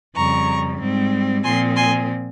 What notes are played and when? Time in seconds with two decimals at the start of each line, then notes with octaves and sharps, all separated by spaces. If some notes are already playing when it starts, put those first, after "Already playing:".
0.16 F2 C#3 G3 A#5 C#6
0.80 G#2 G3 C4
1.44 A#2 F3 C4 G#5 C6
1.76 G#5 C6